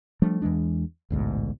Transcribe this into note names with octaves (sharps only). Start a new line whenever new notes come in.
F3 G3 A3 D4
E2 E3 G#3 D4
A1 D2 G#2 B2